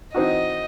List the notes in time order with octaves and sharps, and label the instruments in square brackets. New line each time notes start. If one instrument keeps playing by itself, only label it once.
[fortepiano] E3 C4 D#4 F#4 [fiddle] D#5